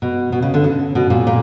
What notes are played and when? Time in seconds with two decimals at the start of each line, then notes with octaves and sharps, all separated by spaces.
0.02 B2
0.32 B2
0.42 C#3
0.54 D3
0.64 C#3
0.95 B2
1.10 A#2
1.27 A#2